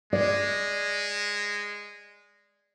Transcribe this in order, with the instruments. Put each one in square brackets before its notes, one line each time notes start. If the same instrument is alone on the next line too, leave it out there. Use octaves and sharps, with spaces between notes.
[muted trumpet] G#3 [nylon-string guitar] D5